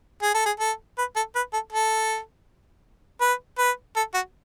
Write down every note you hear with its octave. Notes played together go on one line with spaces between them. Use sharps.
G#4
A4
G#4
A4
B4
A4
B4
A4
A4
B4
B4
A4
F#4